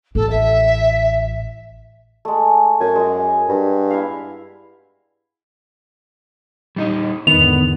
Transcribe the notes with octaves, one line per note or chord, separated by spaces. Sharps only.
A1 A4
E5
G#3 A3
F#2 G#5
G#3 F#4
G2
E4 E5 F5
G3 D#4 D#5
E2 G#2 D3 D#3 B3 F7